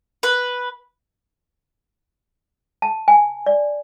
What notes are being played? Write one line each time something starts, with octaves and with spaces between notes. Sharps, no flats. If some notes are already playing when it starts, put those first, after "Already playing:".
B4
A5
G#5
D5